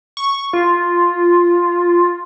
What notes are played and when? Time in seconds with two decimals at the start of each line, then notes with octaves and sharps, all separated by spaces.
0.17 C#6
0.53 F4